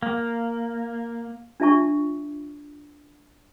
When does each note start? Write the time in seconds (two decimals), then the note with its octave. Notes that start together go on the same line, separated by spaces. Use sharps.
0.03 A#3
1.60 D4 F4 E5 A5 C#6